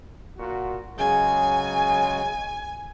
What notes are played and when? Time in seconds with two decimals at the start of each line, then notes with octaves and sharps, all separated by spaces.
0.37 A#2 F#4
0.98 C#3 F#3 G#3 G#5